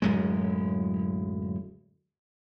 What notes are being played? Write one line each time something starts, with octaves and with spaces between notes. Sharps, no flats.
D1 F#2 G#3